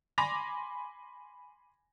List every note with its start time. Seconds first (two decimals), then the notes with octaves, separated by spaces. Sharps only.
0.18 G#5 B5 C6 D6 A#6 F7